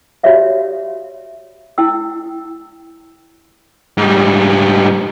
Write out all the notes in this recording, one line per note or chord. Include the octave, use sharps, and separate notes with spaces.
F#4 G4 C#5 D5 E5 F5
E4 G5 E6
G#2 G3